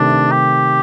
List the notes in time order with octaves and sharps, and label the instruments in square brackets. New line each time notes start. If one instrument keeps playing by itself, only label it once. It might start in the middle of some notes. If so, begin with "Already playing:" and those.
Already playing: [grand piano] C3 D#3 A3 [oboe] D4
[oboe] G4